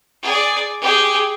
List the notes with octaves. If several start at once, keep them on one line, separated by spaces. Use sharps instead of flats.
G#4 D5
G4 G#4